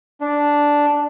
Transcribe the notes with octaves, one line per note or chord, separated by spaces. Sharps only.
D4